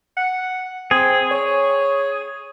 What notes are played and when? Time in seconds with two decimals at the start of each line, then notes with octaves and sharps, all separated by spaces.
0.17 F#5
0.91 C4 G#4
1.31 C#5